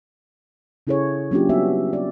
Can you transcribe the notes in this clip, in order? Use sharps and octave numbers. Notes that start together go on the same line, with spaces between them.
C#3 C#4 E4 G#4 A4 C#5
F#3 A#3 C#4 D4 F4 G4
G3 B3 F#4 E5
D5